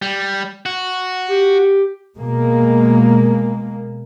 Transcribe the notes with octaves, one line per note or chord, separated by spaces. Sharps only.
G3
F#4
G4
B2 G#3 A#3